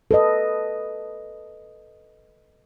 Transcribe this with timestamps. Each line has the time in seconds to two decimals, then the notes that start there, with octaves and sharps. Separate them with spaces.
0.11 A4 B4 D#5